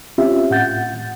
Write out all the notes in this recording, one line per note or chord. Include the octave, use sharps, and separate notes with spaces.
C4 C#4 F4 G4 E5
A2 F#5 G6 A6